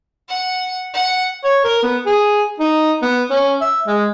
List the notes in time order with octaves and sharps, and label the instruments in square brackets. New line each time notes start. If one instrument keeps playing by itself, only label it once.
[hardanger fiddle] F#5
F#5
[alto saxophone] C#5
A#4
B3
G#4
D#4
B3
C#4
E5
G#3